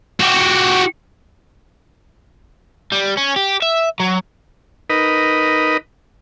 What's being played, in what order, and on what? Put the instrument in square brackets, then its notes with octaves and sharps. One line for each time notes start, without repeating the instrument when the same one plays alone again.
[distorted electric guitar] F#4 G4
[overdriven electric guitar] G3
C#4
G4
E5
F#3
[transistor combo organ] D#4 A#4 B4 D#5 B5